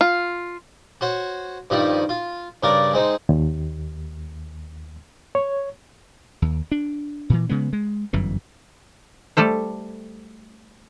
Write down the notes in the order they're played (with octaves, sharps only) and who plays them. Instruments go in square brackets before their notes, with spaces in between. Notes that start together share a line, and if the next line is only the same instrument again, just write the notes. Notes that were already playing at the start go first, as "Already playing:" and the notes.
[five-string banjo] F4
[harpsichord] F#4 C5 C#5
G2 D#3 F3 G3 D#4
F4
G2 C#3 A#4 D5 A#5 D6
G#3 C4 D#4
[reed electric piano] D#2
C#5
[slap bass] D#2
D4
A#2 E3
C#3 G#3 B3
G#3
G1 F#2 E3
[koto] G3 A3 A4 C5